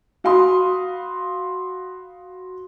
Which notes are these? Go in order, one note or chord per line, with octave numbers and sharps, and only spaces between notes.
F#4 F5 B5 C6 D#6